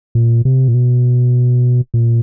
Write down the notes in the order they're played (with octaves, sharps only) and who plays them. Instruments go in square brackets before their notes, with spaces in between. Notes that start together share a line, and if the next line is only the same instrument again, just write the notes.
[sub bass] A#2
C3
A#2
B2
A#2